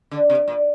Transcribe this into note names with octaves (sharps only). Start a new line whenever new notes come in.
D3
C3
A#2